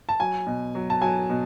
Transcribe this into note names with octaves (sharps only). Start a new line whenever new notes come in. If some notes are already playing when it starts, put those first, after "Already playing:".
A5
F#3 G#5
B2
F#3
A5
F#3 G#5
B2